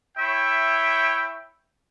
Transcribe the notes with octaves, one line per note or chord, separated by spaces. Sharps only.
E4 C#5 E5 G5